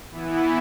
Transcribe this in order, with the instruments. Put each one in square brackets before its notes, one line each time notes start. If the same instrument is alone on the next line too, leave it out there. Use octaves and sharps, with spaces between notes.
[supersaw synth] E3 B3 E4